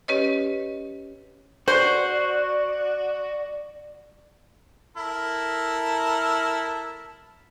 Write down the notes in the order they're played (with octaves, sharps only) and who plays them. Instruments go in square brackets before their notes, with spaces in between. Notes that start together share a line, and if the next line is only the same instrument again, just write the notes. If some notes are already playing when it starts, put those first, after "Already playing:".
[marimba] C#4 G4 B4 C#5 D#5
[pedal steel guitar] F#4 [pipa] C5 [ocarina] D5
[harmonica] E4 A4 A#4